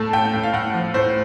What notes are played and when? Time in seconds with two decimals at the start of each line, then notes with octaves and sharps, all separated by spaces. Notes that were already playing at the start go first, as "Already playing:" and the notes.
Already playing: A2 A3 A5
0.13 A2 G5
0.33 A2
0.43 F5
0.53 A2 F#5
0.74 F3
0.94 A2 C5